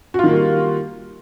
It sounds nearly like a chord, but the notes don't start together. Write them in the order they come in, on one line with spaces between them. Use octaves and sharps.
F#4 F4 D#3 A#3 G3